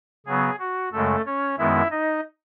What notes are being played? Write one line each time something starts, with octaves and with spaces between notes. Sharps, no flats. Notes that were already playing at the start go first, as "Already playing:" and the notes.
C#3 F#3 B3 G#4
F#4
F#2 C#3 G#3 A3 A4
C#4 C#5
F#2 D#3 G#3 B3 E4 E5
D#4 D#5